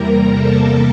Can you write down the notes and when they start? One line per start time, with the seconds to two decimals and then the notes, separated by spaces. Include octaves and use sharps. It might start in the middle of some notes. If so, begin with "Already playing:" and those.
Already playing: E2 C3 G3 A#3 A#4 A#5
0.30 A4 A5